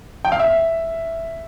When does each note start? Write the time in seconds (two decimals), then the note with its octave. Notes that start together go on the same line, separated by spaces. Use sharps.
0.25 G5
0.32 F5
0.39 E5